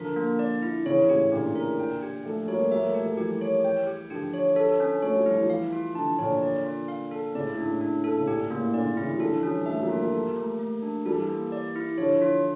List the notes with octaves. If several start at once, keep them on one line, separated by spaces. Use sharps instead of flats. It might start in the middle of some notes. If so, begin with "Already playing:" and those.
Already playing: D3 F3 A#4
A#3
D5
E4
C#3 E3 C#5
A2 C#3 G4
A#2 D3 G4
A#4
G5
G4
F3 A3 G4
G3 A#3 C#5
G3 A#3 E5
F3 A3
G4
F3 A3
E3 G3 G4
C#5
G5
G4
D3 F3 G4
C#5
A4
C#4
A3 C#5
G3
F3 E4
E3 G3
F5
F4
D3 F3 A5
A#2 D3 C#5
D5
F4
F5
A4
A2 C#3 D5
A2
D4
A2
D4
A4
C#3
A#2 G4
A2 C#3 A#3
A#2 D3 D5
D3
C#3 E3 E4
G3
D3 F3 A4
E3 G3 C#4
F3 A3 E5
G3 A#3
F4
G3 A#3
A4
A3
A3
D4
E3 G3 A4
A#3
D5
E4
D3 F3 C#5
F4